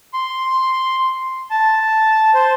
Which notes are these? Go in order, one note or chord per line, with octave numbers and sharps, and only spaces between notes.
C6
A5
C5